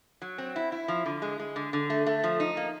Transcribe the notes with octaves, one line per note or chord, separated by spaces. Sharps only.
F#3
C4
E4
E4
F3
D3
G#3
G#3
D3
D3
A3
A3
F3
D#4
A#3